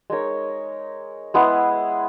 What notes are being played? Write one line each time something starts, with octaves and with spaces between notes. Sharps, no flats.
G#3 D#4 A#4 C#5
G#3 B3 E4 G#4